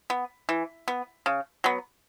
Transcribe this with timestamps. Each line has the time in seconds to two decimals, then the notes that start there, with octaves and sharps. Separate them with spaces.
0.10 B3
0.49 E3
0.88 B3
1.26 C#3
1.64 F#3 B3